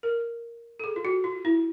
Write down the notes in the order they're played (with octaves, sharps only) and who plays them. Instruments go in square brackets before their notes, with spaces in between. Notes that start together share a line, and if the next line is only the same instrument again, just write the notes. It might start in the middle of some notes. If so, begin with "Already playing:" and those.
[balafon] A#4
A4
G#4
F4
F#4
F4
E4